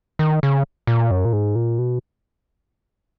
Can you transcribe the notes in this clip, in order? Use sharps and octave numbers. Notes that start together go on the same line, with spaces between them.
D#3
C#3
A#2
F#2
A#2
G#2
A#2
B2